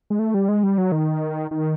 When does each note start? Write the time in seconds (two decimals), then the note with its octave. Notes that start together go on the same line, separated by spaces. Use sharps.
0.10 G#3
0.19 A3
0.34 G3
0.49 G#3
0.63 G3
0.78 F#3
0.92 D#3
1.51 D#3